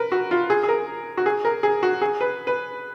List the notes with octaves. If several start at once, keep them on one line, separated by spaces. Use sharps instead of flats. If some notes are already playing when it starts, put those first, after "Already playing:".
Already playing: A#4 B4
F#4
F4
G#4
G#4
A#4
F#4
G#4
A#4
G#4
F#4
G#4
B4
B4